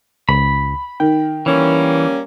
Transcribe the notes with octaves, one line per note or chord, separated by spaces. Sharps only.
C#2 B5
D#3 G5
E3 G3 A#3 C#4